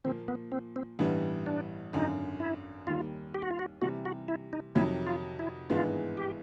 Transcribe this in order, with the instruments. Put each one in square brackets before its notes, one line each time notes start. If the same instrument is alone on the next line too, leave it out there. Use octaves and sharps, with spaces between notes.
[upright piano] A#2 F3 A#3 [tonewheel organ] C4
[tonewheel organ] B3
C4
C4
[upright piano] A1 G2 E3 G3 B3
[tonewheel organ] D4
[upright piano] G#1 F#2 D3 [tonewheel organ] D#4
[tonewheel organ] E4
[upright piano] D#2 D#3 G3 [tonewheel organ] F4
[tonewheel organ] G4
F#4
F4
F#4
[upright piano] C3 E3 G3 [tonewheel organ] F#4
[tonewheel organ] F#4
E4
D#4
[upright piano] F2 C3 D#3 F#3 [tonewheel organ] E4
[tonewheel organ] F4
E4
[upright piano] G#1 G2 E3 G#3 B3 [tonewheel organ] F4
[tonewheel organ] G4